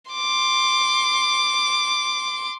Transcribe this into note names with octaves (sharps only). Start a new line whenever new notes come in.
C6 D6